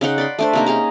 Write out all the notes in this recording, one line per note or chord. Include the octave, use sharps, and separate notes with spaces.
C#3 D#4 F#5 C6
D5 B5 C6
A3 D4 C5
C3 A#3 D#4
C#4 G#4 F5 A#5